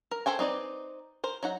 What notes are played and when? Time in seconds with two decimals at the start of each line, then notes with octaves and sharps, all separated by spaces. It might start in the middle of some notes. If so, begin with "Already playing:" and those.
0.11 A#4
0.26 G#4 A4 C5 G5 G#5
0.39 C4 D#4 B4 D5
1.24 A#4 C5
1.43 F#3 D#4 F#5